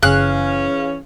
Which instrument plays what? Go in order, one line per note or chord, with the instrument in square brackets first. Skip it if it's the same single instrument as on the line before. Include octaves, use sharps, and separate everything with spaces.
[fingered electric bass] F#1 C#3 [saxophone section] E3 C#4 [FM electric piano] G#4 F5 [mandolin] F#6